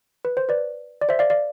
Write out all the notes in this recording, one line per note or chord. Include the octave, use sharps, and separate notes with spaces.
B4
C5
B4 D5
D5
C5 E5
D5 F5
D5 F5